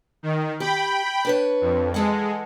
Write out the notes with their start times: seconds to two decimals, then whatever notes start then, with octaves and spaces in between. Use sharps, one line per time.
0.23 D#3
0.60 G4 G5 B5
1.25 D4 B4 C#5
1.61 F2
1.94 E3 G#3 A4 F#5